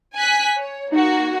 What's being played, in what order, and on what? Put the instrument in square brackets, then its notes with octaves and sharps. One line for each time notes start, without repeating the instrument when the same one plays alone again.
[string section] G#5 F#6 B6
C#5
[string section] A#3 F#4 [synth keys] D#4